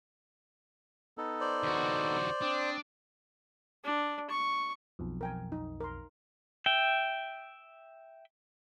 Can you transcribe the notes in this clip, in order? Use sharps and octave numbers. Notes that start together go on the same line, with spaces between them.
B3 D#4 A4
C5 D5
D#2 F#4
C4 D4 D6 D#6
D4
C#6
B1 F2
A#4 G5 G#5
D#4
A#4 C6
E5 G5